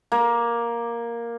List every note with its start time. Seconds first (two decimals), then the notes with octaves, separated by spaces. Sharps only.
0.12 A#3